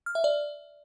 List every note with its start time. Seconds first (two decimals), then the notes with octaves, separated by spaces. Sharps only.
0.06 F6
0.15 E5
0.24 D5